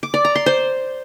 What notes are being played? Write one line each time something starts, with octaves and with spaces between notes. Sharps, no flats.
D6
D5
A#5
C6
C5